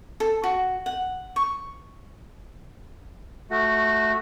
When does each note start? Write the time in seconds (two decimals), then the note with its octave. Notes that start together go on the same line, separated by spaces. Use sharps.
0.20 A4
0.44 F#4
0.86 F#5
1.36 C#6
3.50 A3 F#4